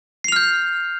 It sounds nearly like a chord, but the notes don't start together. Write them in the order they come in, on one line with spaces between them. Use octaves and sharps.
C7 F7 F6 G6